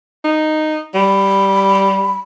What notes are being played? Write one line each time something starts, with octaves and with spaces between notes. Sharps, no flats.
D#4
G3 B5